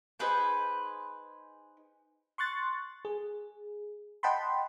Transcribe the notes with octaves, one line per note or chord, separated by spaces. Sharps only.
D#4 G#4 B4 C5
C6 C#6 F#6 A6
G#4
D#5 F#5 G5 A5 B5 C6